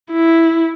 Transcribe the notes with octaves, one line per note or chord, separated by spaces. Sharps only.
E4